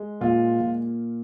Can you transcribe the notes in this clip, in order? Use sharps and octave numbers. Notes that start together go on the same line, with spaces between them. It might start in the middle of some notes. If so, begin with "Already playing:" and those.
Already playing: G#3
A#2 F4
A#2